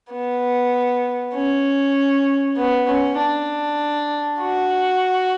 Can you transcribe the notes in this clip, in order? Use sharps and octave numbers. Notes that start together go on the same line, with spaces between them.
B3
C#4
B3
C#4
D4
F#4